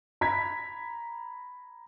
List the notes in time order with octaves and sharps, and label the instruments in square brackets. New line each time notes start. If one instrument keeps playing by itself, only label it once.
[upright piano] A#5 B5 G#6 B6